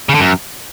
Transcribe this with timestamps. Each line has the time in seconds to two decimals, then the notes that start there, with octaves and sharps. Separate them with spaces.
0.09 C#3
0.14 D3
0.20 F#2